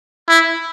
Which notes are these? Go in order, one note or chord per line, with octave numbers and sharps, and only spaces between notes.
E4